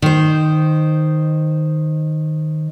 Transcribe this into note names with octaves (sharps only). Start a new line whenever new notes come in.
D#3 C5